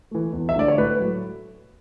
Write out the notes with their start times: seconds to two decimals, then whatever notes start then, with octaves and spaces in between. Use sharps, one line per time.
0.11 E3 A3
0.33 E2
0.49 E5
0.56 D3 A3 D5
0.68 C#5
0.77 A2 B4
1.00 F#3 A3